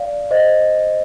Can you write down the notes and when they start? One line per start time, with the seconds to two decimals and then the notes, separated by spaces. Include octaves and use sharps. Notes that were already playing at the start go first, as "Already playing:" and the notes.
Already playing: D5 F5
0.31 C5 D#5